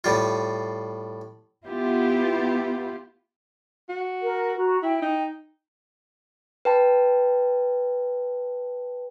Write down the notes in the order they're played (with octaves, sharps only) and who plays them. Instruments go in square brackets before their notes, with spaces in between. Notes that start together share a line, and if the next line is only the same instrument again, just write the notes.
[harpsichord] A2 G3 F4
[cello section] B3 E4 F4 G4
[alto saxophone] F#4
[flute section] A#4
F#4 A#5
[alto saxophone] E4 [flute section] G5
[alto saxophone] D#4
[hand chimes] B4 G5 A5